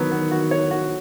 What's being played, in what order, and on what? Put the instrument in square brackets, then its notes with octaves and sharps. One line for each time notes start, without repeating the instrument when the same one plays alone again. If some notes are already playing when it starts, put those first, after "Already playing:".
Already playing: [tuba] D#3 [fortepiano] F#3 B3
[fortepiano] B3
F#4
C#5
F#4